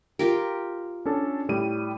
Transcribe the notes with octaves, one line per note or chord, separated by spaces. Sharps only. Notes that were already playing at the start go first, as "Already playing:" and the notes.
F4 G4 A#4
C#4 D4 A4
A2 G3 D#7